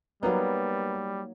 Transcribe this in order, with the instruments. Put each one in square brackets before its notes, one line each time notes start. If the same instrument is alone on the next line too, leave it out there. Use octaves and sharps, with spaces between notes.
[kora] F#3 A#3 D#4 [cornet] G3 [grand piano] B3